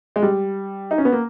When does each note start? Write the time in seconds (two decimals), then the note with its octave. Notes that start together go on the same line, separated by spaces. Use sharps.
0.16 G#3
0.22 G3
0.91 D#4
0.98 C#4
1.05 B3
1.12 A#3